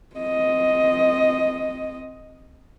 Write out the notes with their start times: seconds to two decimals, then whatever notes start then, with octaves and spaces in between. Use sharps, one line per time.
0.16 C4 D#5